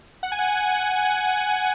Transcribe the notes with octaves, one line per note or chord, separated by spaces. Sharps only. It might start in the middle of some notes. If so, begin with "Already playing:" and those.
F#5
G#5
F#5
G#5
F#5
G#5
F#5
G#5
F#5
G#5
F#5